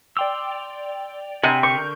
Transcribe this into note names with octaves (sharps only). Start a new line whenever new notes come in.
D5 G5 C6 D6 E6 F7
C3 G#4 F#5 G#5
D3 A#4 C#6 G6